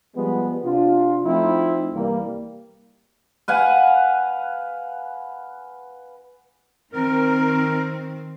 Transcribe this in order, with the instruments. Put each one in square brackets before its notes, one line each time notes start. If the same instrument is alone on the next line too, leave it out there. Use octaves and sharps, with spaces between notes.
[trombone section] F3 G3 G#3 B3
C3 D4 F4
F3 A3 C4 D#4 E4
C2 E3 G3 A#3
[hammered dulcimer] B4 F5 F#5 G#5
[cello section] D#3 C4 [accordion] A#4